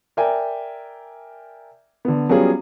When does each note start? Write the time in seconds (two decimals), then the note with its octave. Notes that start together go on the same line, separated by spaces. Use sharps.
0.17 A#4 D5 E5 G5 G#5
2.05 D3 B3
2.29 F#3 G3 B3 C#4 F4 G#4